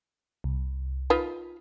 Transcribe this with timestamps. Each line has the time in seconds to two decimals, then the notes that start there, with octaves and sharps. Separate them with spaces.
0.44 C2
1.10 D#4 F4 B4